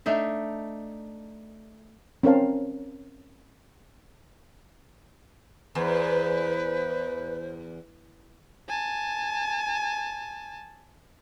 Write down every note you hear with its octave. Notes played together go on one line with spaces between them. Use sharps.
A3 D4 D#4 E5
C4 C#4 A#4 F5 A5
E2 B4 C5
G#5 A5